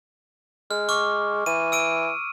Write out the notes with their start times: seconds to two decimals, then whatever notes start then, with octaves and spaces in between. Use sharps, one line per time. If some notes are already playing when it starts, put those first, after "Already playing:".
0.71 G#3 F6
0.89 C#6 D6 F6
1.46 E3 D#7
1.72 E6 D7 D#7